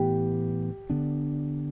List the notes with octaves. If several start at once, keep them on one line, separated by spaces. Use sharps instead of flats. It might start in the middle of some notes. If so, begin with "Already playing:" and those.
Already playing: A2 E3 B3 G4
D3 B3 D4